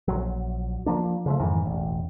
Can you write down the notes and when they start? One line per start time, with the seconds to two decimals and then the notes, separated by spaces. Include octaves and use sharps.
0.08 A#1 F#3
0.86 F3 A#3 D4
1.26 C#3 F3 A3
1.40 F2 G#2 D#3 E3
1.65 E1 A1